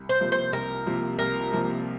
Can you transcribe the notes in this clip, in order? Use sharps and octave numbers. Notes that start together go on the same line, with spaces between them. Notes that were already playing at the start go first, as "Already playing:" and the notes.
Already playing: C2
C5
C3 F3 A#3
C5
C2 A#4
C3 F3 A#3
C2 A#4
C3 F3 A#3